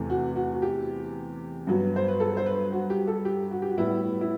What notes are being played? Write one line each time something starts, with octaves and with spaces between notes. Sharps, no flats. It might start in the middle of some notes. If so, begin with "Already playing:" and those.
Already playing: E2 C3 E3 A3
F#4
F#4
F#4
G4
G2 F#3 B3
C5
B4
A4
C5
B4
F#4
G4
A4
G4
F#4
G4
F#4
A2 G3 B3 E4
E4